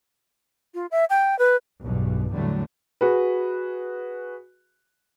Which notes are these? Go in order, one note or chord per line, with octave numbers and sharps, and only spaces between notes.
F4
E5
G5
B4
B1 E2 G2 B2
E2 A2 D3 F#3 G3 A3
F#4 G#4 B4